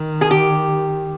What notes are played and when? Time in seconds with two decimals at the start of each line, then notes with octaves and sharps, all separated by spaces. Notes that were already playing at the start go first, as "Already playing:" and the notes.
Already playing: D#3
0.21 G#4
0.31 G4